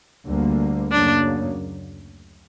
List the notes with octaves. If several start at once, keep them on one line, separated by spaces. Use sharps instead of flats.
D2 D3 G3 A#3
F#2 C#3 F#3 A#3 D4